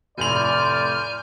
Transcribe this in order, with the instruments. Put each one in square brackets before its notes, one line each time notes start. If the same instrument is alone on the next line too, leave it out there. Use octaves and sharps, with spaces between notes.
[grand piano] F1 A2 F7 [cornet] D5 [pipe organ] G#5 F6 G6 [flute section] C6